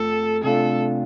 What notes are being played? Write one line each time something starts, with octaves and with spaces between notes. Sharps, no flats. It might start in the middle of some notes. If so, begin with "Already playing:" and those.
Already playing: F2 F3 A3 A4
C3 A3 D4 F4 A4